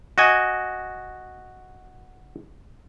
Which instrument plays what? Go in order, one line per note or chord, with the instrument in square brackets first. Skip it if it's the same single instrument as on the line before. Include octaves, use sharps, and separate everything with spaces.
[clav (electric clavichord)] F#4 D#5 G#5